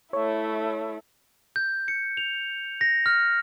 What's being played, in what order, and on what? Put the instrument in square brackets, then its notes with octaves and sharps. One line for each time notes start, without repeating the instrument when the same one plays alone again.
[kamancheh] A3 E4 [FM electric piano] C#5
[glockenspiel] G6
C#7
F7
A#6
F6